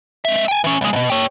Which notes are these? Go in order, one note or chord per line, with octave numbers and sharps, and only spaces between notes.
G#3 E5
G5 G#5
E3 C#4
C2 G#3
G#2 B2
G4 C#5